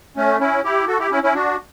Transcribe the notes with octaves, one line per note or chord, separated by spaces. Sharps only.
A3 C#4
C#4 E4
E4 G4
F#4 A4
E4 G4
C#4 E4
C#4 E4
D4 F#4